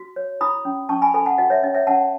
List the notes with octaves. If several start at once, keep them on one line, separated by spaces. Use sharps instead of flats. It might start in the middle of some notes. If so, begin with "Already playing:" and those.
Already playing: F#4
C#5
E4 B5 D#6
C#4
C#4 A5 C#6
G#5 B5
A4 G#5 B5
F#5 A5
F#4 D#5 F#5
C#5 E5
C#4 D#5
C#5 E5
C#4 F#5 A5